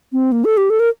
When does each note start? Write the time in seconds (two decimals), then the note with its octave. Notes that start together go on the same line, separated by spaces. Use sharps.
0.13 C4
0.32 A#3
0.45 A4
0.57 G4
0.70 A4
0.80 A#4